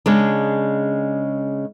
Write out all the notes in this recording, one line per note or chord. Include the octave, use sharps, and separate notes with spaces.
C#3 G#3 D4